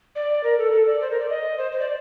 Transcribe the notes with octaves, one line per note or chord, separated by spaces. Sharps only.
D5
A#4
A4
A4
D5
C5
A#4
D5
D#5
C5
C5
D5